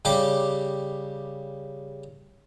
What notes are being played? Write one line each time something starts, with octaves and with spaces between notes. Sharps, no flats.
C#3 G3 G4 D6